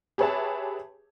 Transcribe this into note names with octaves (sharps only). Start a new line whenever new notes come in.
G4 G#4 B4 C#5 E5 A5